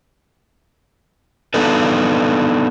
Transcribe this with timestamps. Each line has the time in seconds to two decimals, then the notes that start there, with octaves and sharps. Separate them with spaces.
1.54 B3 D4 D#4 A4 B4